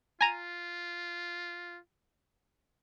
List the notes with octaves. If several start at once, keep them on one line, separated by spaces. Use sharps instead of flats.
F4 G#5 A#5 D#7